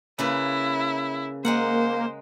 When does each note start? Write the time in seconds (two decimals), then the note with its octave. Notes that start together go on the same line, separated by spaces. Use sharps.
0.19 C#3 A#3 E4 B4
1.45 G#3 A#3 A#4 C5 F#5